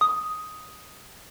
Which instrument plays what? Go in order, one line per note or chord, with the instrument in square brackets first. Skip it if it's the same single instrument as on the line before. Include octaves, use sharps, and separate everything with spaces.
[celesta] D#6